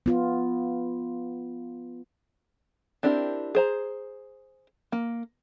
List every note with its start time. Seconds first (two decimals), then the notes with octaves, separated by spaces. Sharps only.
0.06 B3 F4
3.03 C4 D4 E4 G4 A#4
3.55 G#4 C5 A#5
4.92 A#3